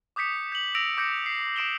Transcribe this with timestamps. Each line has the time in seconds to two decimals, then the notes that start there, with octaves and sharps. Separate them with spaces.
0.16 D6 D#6 G6 B6 C#7
0.52 G6 F#7
0.75 E6 A#6 D7 F7
0.98 D6 G6 A#6 C#7 D7
1.26 C7
1.56 D6 D#6 D7 E7 F#7 G7